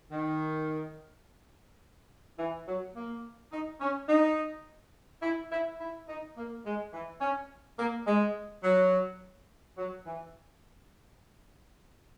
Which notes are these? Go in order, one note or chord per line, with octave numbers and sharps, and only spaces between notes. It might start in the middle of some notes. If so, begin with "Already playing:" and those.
D#3
E3
F#3
A#3
D#4
C#4
D#4
E4
E4
E4
D#4
A#3
G#3
E3
C#4
A#3
G#3
F#3
F#3
E3